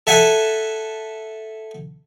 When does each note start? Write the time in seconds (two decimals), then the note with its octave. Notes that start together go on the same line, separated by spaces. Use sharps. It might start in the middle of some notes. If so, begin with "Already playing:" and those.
0.07 A4 E5 F#5 G#5